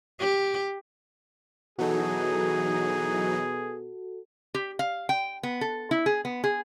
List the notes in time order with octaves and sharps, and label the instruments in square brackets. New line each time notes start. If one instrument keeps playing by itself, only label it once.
[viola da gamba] G4
[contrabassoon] B2 [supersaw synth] E3 F#3 D#4 [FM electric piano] F#4 A4 [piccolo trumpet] G#4
[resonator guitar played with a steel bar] G4
F5
G5
B3
A4
E4
G#4
B3
G#4